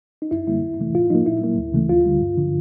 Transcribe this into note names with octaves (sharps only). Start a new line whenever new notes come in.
D#4
F#2 E4
D3 G3 A#3 E4
F2
C3 E3 A3
A2 F4
F3 A#3 D#4
A#2 E4
F#3 A#3
D2
C#3 E3 A3
D2 F4
D3 G3
G2
D3 F3